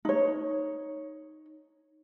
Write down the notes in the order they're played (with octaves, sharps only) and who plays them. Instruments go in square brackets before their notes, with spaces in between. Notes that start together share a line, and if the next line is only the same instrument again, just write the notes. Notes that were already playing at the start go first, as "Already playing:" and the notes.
[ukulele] D#4 C#5